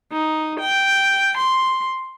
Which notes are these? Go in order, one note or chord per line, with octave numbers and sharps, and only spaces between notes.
D#4
G5
C6